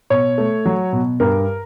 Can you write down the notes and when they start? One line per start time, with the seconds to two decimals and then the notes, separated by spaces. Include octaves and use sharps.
0.10 B2 C#5
0.38 A3
0.65 F#3
0.93 B2
1.20 G2 A#4